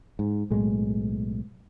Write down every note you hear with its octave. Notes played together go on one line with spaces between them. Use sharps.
G#2
B1 A2 G#3